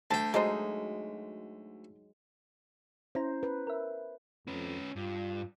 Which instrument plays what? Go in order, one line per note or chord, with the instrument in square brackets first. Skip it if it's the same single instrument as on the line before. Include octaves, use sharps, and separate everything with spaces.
[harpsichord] D2 G5 [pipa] A5
[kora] F#3 G#3 D#4 [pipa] A4 C5 D#5
[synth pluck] C#4 E4 A#5 [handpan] C5
[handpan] B4
[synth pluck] A#4 E5
[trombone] F2 [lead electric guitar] C#4 B4
[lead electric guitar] G2 [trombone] F4